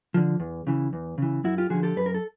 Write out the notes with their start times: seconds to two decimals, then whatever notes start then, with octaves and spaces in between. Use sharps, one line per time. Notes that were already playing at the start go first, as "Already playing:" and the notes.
0.14 D3 F3
0.40 E2
0.67 C#3 E3
0.93 E2
1.18 C#3 E3
1.44 F#2 E4 F#4
1.58 F4 G4
1.70 D3 F3 F#4 G#4
1.83 G4 A4
1.96 F#2 B4
2.06 A#4
2.14 A4